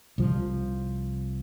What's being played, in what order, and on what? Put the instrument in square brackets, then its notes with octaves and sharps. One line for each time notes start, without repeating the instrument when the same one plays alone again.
[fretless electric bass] C2 F3